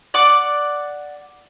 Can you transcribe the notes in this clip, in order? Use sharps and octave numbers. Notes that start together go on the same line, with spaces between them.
D5 F#5 D6